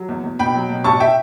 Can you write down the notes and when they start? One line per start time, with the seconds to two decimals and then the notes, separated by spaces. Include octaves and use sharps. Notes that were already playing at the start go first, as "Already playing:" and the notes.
Already playing: F#3
0.09 E2
0.24 E2
0.39 B2 G5 B5
0.55 F#3
0.69 B2
0.84 A1 A5 C#6
1.00 E5 G5